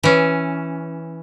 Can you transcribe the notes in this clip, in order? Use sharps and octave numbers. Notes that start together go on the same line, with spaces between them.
E3 C#4